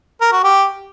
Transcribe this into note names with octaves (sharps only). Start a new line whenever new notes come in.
A#4
F#4
G4